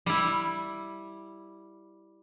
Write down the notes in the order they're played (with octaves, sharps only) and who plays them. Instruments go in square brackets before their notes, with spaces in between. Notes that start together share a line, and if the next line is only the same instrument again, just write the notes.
[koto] G3 E4